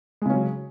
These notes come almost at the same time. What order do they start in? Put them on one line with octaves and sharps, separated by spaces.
G#3 C#3 C#4 F#3